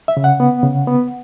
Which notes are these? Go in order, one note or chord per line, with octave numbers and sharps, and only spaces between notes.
E5
C#3
F#5
B3
C#3
B3